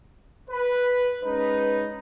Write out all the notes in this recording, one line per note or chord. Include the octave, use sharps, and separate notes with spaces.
B4
G#3 C#4 D#4 B4